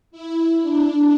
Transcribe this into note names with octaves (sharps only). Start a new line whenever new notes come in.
E4
D4